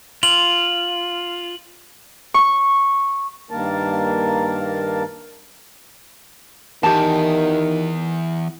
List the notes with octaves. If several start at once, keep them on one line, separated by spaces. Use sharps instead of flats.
F4 F#7
C#6
G2 D#3 A#3 A#4 A5
E2 D#3 G4 A5